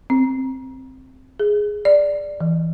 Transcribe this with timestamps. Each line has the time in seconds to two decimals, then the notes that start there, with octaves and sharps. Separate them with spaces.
0.10 C4
1.40 G#4
1.85 D5
2.40 E3